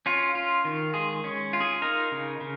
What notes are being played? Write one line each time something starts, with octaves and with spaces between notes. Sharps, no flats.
C#4 F4
F4
D#3
G#3 G#4
C#4
F4
G#4
D#4 A#4
C#3
C#3